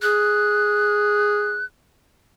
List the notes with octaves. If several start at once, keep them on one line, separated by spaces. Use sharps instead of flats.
G#4 F#6